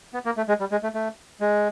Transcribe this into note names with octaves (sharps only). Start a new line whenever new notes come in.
B3
A#3
A3
G#3
G3
G#3
A3
A3
G#3